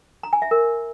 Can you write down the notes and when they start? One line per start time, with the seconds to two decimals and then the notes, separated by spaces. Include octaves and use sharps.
0.23 A#5
0.33 G#5
0.42 E5
0.51 A#4